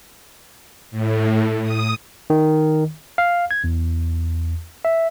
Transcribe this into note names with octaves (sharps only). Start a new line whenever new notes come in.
A2
D#6
D#3
F5
G#6
E2
E5